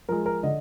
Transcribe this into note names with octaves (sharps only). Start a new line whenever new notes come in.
F3 G#3 A#4
A#4
D3 D#5